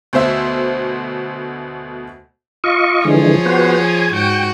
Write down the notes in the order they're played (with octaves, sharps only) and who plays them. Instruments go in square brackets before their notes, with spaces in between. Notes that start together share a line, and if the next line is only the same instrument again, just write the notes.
[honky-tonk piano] D2 B2 C5 E5
[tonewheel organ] F4 D#5 C#6
[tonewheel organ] D3 E3 G#3 [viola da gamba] F3 G#4 C#5
[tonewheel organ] B3 F#4 C5
G#5
[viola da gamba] G#2 F#4 [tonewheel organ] G5